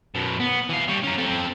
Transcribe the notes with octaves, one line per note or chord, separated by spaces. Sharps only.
F#2 B2
B3
E3 F5
G3 C#5
C#4 A#4
C4 A4